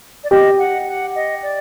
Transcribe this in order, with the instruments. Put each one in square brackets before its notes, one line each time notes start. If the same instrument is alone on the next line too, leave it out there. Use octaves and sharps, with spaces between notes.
[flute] D5
[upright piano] G4 [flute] D#5
[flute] F#5
F#5
D#5
D5